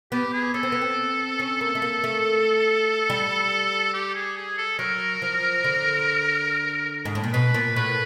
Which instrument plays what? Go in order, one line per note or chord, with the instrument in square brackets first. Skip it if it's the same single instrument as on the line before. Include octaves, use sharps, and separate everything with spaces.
[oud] B3 [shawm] G4
[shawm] G#4
[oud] C#4 [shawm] A4
[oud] C4
B3
C4
C#4
A#3
A3
A#3
A3
G3
[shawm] G4
G#4
G#4
A4
[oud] F#3 [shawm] A#4
[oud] F3
D3
G#2
A2
A#2
[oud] B2 [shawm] B4
[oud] A#2
[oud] A2 [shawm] B4